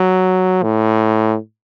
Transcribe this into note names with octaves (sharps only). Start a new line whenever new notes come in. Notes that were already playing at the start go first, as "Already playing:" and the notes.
Already playing: F#3
A2